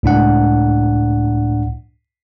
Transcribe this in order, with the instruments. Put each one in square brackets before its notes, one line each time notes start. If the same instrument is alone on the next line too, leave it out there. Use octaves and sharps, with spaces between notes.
[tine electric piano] C#2 A2 D4 F#5